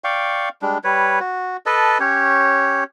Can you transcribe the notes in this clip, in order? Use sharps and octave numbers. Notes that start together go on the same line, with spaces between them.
D5 F5 G5 C#6
G3 G#3 D4
G3 B4 C#5
F#4
A4 B4 D#5 A5
C#4 G4 C#5